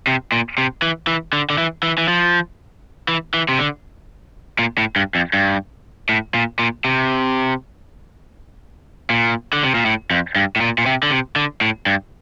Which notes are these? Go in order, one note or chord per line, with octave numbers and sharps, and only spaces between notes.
C3
A#2
C3
E3
E3
D3
D3
E3
E3
E3
F3
E3
E3
C3
D3
A#2
A2
G2
F2
G2
A2
A#2
A#2
C3
A#2
D3
C3
A#2
A2
F2
G2
A2
A#2
A#2
C3
D3
C3
D3
A2
G2